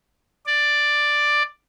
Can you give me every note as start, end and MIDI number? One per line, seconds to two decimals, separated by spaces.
0.46 1.42 74